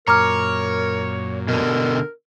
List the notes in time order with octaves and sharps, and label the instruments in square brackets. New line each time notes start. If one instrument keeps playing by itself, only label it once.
[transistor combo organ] F#2 A#2 [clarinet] A#4 [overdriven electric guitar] C#5 [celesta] A#5 D6 F6
[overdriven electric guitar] B2 D3 [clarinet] A#4